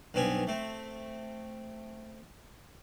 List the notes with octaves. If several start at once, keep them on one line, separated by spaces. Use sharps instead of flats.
B1 G2 B3 C4 G#5
A3 C4